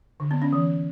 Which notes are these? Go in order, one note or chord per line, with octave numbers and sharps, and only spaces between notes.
D3
B3
C#4
E3